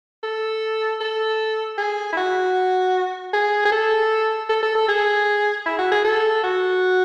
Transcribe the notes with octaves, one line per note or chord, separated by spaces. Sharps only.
A4
A4
G#4
E4
F#4
G#4
G#4
A4
A4
A4
A4
G#4
E4
F#4
G#4
A4
F#4